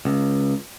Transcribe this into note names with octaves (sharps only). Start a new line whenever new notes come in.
C#2